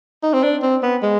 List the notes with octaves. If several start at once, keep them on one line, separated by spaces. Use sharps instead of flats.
D#4
C4
D4
C4
B3
G#3